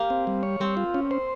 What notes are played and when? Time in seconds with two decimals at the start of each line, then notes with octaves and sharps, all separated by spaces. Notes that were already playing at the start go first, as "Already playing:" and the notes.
Already playing: A#3 G4
0.10 C4
0.27 G3
0.43 C#5
0.60 G3 C4
0.77 F4
0.94 C#4
1.11 C5